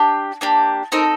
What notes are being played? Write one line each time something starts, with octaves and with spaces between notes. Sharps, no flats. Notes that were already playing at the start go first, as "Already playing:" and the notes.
Already playing: D4 G4
A#3 D4 G4
C4 D#4 A4 A#4